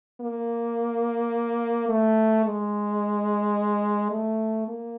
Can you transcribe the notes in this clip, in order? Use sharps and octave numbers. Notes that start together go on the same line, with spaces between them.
A#3
A3
G#3
A3
A#3